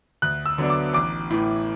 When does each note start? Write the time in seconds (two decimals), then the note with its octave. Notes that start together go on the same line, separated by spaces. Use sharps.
0.22 D2 F#6
0.46 E6
0.58 D3 F#3 B3 D4
0.70 D6
0.94 A1 D6
1.30 A2 E3